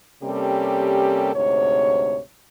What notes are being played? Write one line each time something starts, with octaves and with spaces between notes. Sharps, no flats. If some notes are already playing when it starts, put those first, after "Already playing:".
C3 G3 A#3 C#4 G4 A4
D2 G#2 C3 C#5